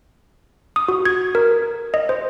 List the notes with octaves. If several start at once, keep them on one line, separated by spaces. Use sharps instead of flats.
D#6
F#4
G#6
A#4
D#5
C5